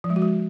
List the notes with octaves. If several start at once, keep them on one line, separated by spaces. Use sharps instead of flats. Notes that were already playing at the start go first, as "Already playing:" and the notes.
F3
G#3
F#4
G#3